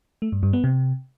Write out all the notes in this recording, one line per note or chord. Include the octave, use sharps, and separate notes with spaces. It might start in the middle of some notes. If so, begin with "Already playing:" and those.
A3
G2
G2
B3
C3